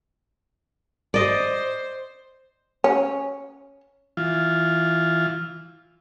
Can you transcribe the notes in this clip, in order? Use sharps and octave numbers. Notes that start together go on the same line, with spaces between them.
C5 D5 D#5
C#4
E3 F4